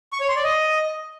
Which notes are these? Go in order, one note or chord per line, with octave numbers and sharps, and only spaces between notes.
C#6
C#5
C6
D5
D#5